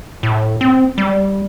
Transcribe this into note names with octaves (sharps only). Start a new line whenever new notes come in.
A2
C4
G3